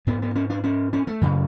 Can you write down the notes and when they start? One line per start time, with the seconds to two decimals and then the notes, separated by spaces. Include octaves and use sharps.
0.07 G#2 B3
0.22 B3
0.35 C#4
0.50 D4
0.64 C#4
0.93 C#4
1.07 A3
1.21 F#2 C#3